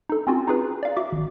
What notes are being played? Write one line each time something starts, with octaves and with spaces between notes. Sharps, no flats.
D#4 A4
C4 C#4 F4 F#4
D#4 F4 G#4 B4
D5 F5
F#4 E5 D6
G#1